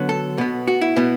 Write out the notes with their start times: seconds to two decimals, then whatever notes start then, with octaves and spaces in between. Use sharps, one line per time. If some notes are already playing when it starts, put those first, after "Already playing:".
Already playing: D3 F#3 B3
0.09 A4
0.38 B2 B3
0.67 F#4
0.81 E4
0.96 B2 B3